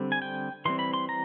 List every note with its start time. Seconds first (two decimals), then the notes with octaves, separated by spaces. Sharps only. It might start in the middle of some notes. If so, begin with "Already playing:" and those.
Already playing: D3 G3 C4
0.12 G#5
0.22 G5
0.65 E3 G3 C4 C6
0.79 B5
0.94 C6
1.09 A#5